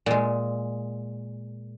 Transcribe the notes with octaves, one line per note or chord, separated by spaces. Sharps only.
A#2 G#3